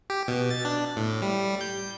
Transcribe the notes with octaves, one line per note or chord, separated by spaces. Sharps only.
G4
B2
A6
D4
A2
G3
G6